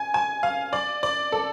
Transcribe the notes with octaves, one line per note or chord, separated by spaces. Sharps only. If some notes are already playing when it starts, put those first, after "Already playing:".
Already playing: G#5
G#5
F5
D5
D5
A4